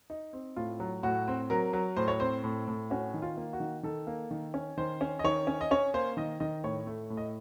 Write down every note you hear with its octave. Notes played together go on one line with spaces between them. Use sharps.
D#4
C4
A2 F4
F#3
A2 F#4
C4
F#3 A#4
F#3
A2 C5
C#5
C4 C5
A2
A2
C#4 F#4
D#3
F4
A#3
F#4
D#3
D#3 A4
A#3
D#3
C#4
D#3 C5
C#4
D#5
D#3 C#5
C#4
D#5
C#4 C#5
A#3 C5
D#3 D#5
D#3 D#5
A2 C#5
A3
A2
D#5